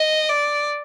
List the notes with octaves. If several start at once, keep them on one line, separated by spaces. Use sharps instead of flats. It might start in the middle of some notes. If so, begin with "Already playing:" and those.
Already playing: D#5
D5